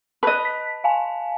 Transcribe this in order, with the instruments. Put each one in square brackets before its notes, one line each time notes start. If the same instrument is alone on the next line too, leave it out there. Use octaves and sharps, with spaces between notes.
[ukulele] B4 D#5 [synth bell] A5 F#6
[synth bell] B6
F5 G#5 A5